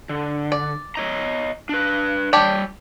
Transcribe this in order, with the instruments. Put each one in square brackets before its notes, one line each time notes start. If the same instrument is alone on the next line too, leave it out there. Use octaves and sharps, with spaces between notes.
[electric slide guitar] D3
[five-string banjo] D5
[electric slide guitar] C#5 D#5 A#5
D4 B4
[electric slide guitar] G3 C#5 [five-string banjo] D4 G4 D5